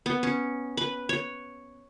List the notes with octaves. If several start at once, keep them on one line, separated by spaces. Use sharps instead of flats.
B3
C#4
B4
C#5